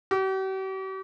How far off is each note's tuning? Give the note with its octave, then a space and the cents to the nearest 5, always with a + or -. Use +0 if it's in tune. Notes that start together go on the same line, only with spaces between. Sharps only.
G4 -45